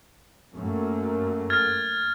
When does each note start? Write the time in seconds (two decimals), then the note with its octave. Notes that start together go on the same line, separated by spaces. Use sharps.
0.53 F#2 A3 A#3
1.50 F6 G#6 A6